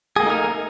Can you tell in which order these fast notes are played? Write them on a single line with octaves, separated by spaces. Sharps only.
G#4 A#3 A3 D#4 A#4